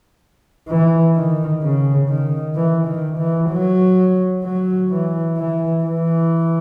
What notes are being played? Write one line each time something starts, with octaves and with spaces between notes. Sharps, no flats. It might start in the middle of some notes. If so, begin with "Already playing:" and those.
E3
D#3
C#3
D#3
E3
D#3
E3
F#3
F#3
E3
E3
E3